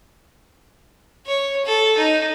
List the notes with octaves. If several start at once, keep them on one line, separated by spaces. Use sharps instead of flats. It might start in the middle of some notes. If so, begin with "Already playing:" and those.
C#5
A4
D#4